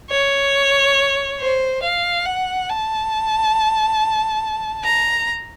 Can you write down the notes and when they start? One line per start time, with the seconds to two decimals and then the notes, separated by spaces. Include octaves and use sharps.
0.11 C#5
1.40 C5
1.83 F5
2.26 F#5
2.69 A5
4.84 A#5